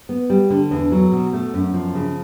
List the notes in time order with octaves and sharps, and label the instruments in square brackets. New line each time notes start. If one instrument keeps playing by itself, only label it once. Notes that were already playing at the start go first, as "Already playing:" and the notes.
[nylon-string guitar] B3
G3
D3
E2
F#3
B2
A3
F#2
F3
C#3